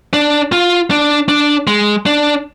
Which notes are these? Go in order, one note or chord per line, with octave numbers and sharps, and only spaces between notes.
D4
F4
D4
D4
G#3
D4